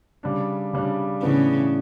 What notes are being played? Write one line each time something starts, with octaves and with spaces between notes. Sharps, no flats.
C#3 G3 D4
C#3 G3 D4
A2 C#3 E3 B3 D4